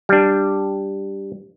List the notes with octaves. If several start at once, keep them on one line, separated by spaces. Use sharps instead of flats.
G3 D4